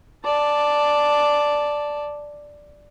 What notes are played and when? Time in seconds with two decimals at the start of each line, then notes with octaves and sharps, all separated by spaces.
0.24 D5 A5